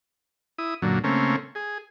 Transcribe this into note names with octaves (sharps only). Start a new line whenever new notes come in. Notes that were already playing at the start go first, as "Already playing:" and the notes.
E4 D#6
F#2 A#2 D3 F#3
C#3 A3 A#3 C4 C#4
G#4